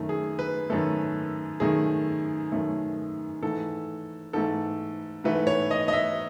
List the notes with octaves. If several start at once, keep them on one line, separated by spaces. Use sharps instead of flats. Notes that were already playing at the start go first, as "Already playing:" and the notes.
Already playing: F#2 D#3 A3
G#4
B4
F#2 D#3 A3 A4
F#2 D#3 A3 G#4
F#2 D#3 A3
G#2 E3 A3 A4
G#2 E3 A3 A4
G#2 E3 A3 B4
C#5
D#5
D#5
E5